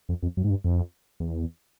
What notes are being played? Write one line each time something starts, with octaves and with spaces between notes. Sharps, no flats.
F2
F2
F#2
G#2
G2
F2
E2